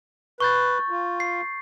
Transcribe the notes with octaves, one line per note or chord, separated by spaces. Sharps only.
B4 C#6 G6 A6
F4
C7